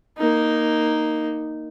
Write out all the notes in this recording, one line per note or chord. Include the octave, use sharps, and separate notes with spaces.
A#3 D#4